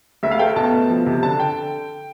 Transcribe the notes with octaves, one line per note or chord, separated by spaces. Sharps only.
D2 E5
F5
A3 G5
B2 A5
B2
F3
C3
D3 A5
D3 G5